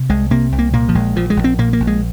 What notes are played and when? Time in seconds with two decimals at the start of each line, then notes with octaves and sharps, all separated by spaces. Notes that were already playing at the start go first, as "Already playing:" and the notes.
Already playing: C3
0.10 C2 G#3
0.31 C3 A#3
0.52 C2
0.59 A#3
0.73 A#2 A#3
0.89 F3
0.95 A#1 G#3
1.16 A#2 F3
1.30 G#3
1.37 A#1
1.44 C4
1.58 A#2 A#3
1.73 A#3
1.80 A#1
1.87 G#3